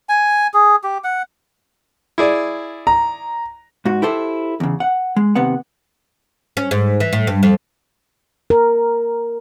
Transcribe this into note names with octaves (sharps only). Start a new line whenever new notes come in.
G#5
G#4
G4
F#5
E4 G#4 D5
A#5
G#2 F#4
E4 G4 A4 C5
E2 C#3
F#5
G#3
D#2 C3 B3 F#5
C#4
G#2
E3
A2
G2
F2
A#4